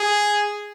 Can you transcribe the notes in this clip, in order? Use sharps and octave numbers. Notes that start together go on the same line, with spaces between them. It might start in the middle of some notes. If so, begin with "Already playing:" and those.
Already playing: G#4